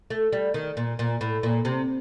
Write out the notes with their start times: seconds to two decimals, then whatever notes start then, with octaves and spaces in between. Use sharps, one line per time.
0.10 A3
0.33 G3
0.54 D#3
0.77 A#2
0.99 A#2
1.21 A2
1.43 A#2
1.65 C3